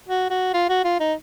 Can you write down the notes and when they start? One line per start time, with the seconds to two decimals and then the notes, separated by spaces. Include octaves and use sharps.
0.08 F#4
0.30 F#4
0.54 F4
0.69 F#4
0.84 F4
1.00 D#4